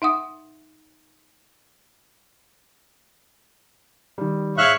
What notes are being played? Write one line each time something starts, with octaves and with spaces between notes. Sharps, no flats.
D#4 E5 F#5 D#6
D#3 G3
G#2 C#5 E5 F5 F#6